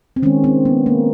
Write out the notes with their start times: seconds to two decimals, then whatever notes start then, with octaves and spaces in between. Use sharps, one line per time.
0.16 C4
0.23 D#3 G#3 C#4
0.44 C4
0.65 B3
0.86 A#3